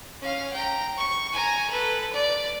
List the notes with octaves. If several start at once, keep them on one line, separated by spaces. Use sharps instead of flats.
C#4 F5
G5 A#5
C#6
G#5 A#5
A4 B4
D5